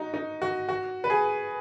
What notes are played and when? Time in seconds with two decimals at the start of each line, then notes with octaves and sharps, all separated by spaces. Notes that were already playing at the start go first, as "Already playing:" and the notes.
Already playing: D#4 F#4
0.14 D#4
0.42 F#4
0.69 F#4
1.04 B4
1.10 G#4